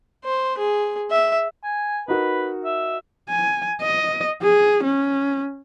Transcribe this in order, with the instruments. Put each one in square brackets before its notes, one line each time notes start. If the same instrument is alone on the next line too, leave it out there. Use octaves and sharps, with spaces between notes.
[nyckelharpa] C5
G#4
E5
[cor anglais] G#5
[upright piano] D#4 F#4 A#4 [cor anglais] B4
[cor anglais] E5
[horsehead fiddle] G#5
D#5
G#4
C#4